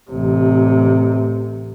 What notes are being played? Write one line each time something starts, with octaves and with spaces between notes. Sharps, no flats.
A1 C3